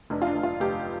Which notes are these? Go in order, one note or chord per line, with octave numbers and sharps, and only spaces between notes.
F1 D4
F4
D4
F1
F4
F1 G4